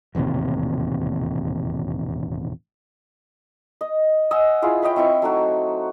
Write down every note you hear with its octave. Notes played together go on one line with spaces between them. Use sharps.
E1 A1 D#2 C3
D#5
D#5 F#5 G#5 E6
E4 F4 G#4
B4 C#5 D#5 G5
C4 E4 C#6
F#3 A3 D#4 F#4